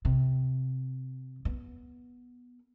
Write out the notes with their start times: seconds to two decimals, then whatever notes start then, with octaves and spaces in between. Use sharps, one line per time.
0.05 C3
1.45 B3